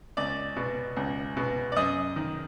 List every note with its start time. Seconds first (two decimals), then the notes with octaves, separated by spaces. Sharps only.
0.17 C#2 D5
0.56 B2
0.97 C#2
1.37 B2
1.72 D5
1.76 F#2 D#5
2.16 D#3